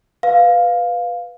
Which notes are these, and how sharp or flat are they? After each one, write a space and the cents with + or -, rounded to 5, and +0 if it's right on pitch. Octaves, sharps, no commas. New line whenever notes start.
B4 +0 F5 +5